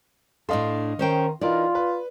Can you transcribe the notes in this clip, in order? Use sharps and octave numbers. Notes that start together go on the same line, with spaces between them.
A2 D4 A4 D#5 F5 C6
D#3 C#4 C5 G5
E3 D#4 F4 A#4 D5
B4